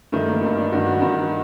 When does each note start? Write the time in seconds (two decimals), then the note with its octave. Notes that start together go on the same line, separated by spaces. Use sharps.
0.12 G2 D#3 A3
0.27 A#3
0.42 G2 D#3
0.57 D4
0.72 G2 D#3 F#4
0.87 F#4
1.00 G2 D#3 D#4
1.13 F#4